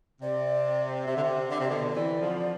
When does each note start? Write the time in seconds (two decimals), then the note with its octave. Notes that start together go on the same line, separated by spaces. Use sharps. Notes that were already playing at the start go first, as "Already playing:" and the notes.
0.22 C3 D5
1.07 C3 E5
1.15 D3
1.22 C3
1.49 D3 D5
1.57 C3 E5
1.64 B2 D3 D5
1.88 F3
1.92 C3 E3 D5
2.20 D3 F3